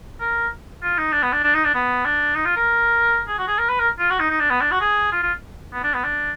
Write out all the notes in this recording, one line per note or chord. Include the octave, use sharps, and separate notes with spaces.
A#4
F4
D#4
D4
B3
D4
D4
D#4
D4
B3
D4
D#4
F4
A#4
G#4
F#4
G#4
A#4
B4
A#4
F4
F#4
D#4
D#4
D4
B3
D4
F#4
G#4
F4
F4
B3
D4
B3
D4